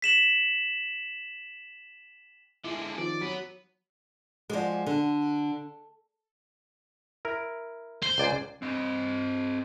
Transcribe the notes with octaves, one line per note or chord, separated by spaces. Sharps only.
B6 E7 F#7
D3 G#3 E4
D#3 F3 D5
F#3 B3
F3 G#3 F#4 D5
D3
E4 A#4
C5
C#2 D5 G#5
C4 D#5